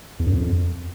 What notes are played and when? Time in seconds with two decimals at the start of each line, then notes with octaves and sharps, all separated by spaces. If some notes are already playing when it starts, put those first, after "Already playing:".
0.20 E2
0.27 F#2
0.34 F2